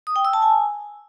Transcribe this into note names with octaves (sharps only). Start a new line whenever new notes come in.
D#6
G5
E6
A5
G#5